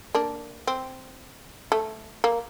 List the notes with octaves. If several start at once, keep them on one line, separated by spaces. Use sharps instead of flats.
A#3 D4
C4
A3
A#3